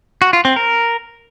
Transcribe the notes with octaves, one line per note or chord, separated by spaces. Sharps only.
F#4
F4
C4
A#4